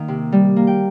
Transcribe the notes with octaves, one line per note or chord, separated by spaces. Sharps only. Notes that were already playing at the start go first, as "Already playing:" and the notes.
Already playing: D#3 A#3
C3
G3
A#3
G5